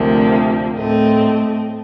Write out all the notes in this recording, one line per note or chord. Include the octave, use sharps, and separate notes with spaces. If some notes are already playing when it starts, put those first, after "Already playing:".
Already playing: D2 C3 F3 A#3
A2 A3 C4 D#5